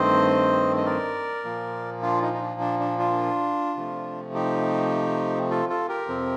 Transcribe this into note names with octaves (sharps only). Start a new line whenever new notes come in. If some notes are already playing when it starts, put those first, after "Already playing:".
Already playing: G2 D#3 A3 C4 C5 D#5
D#5
A#4 D5
A#2 F3 A#3
D4 F4
D#4
D#4
D4
D4
D4
D4 F4
C3 F3 A3
D#4 G4
F4 A4
F4 A4
G4 A#4
F2 C3 F3 C4